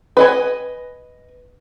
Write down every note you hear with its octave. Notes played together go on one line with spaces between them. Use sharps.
B4 D#5 G#5